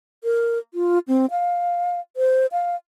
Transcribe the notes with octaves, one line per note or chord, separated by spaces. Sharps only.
A#4
F4
C4
F5
C5
F5